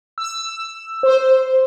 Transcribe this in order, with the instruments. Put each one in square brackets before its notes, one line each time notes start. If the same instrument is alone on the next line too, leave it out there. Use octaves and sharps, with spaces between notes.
[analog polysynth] E6
C5